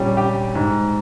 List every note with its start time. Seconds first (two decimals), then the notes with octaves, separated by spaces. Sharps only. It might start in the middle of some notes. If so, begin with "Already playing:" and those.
Already playing: A#2 G3 C#4
0.17 G4
0.55 G#2